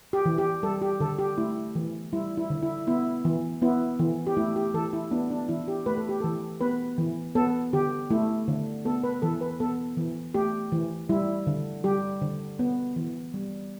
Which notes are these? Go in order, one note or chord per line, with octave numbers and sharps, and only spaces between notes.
G4
E3
G4
G3 A4
G4
D3 A4
G4
A3 E4
E3
G3 E4
E4
D3
E4
B3 E4
E3
B3 E4
E3
G4
A3 E4
G4
E3 A4
E4
B3 D4
D4
E3 E4
G4
A3 B4
A4
G4
E3 A4
B3 B4
E3
B3 A4
D3 G4
A3 E4
D3
B3 A4
B4
E3 A4
B4
B3 A4
E3
A3 G4
E3
G3 E4
D3
G3 G4
D3
B3
E3
G3